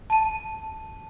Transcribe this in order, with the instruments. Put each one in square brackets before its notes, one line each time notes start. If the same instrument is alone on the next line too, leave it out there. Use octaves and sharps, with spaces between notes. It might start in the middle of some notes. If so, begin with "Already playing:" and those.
[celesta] A5 D#7